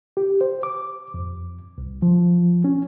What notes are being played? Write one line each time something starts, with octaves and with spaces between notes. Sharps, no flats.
G4
C5
D6
F2
C2
F3
C#4